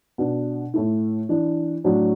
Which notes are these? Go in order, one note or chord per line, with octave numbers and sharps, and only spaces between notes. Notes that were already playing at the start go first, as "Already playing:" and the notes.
B2 B3 D4
A2 A3 E4
E3 D4
A2 F#3 D4